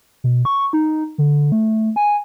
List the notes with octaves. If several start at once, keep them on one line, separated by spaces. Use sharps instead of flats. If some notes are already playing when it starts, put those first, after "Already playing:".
B2
C#6
D#4
D3
A3
G#5